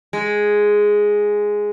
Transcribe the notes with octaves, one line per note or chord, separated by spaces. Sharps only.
G#3